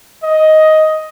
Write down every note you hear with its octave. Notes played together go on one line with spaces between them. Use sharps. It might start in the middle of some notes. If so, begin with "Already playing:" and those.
D#5